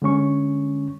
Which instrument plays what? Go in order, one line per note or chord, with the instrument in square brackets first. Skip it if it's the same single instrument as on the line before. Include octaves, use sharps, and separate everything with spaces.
[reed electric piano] D3 G#3 C#4 C#6